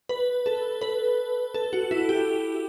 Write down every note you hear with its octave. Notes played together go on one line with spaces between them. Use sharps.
B4
A4
B4
A4
F#4
E4
G4